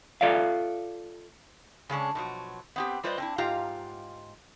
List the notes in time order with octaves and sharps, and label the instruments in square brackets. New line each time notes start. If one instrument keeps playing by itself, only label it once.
[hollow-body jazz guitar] F4 A4 D5 E5 F5
[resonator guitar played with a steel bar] C#3 G#3 C#4 D4
B2 F3 F#3
B3 C4 G4
G3 F4 B4 C5 D5 D#5
C4 D4 E4
G#2 F4 G4 F5 A#5